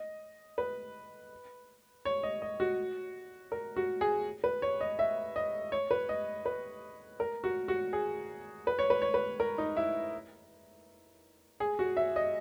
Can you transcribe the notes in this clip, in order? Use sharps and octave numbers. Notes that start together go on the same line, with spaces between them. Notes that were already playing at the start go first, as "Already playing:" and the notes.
Already playing: D#5
B4
C#5
D#5
D#5
F#4
A#4
F#4
G#4
B4
C#5
D#5
E5
D#5
C#5
B4
D#5
B4
A#4
F#4
F#4
G#4
B4
C#5
B4
C#5
B4
A#4
D#4
E4
G#4
F#4
E5
D#5